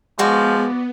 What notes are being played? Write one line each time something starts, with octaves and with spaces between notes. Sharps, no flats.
F3 G#3 B3 F#4 D5 C#6